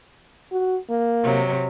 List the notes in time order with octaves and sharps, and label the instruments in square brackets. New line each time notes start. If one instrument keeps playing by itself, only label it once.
[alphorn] F#4
A#3
[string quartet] C3 F#3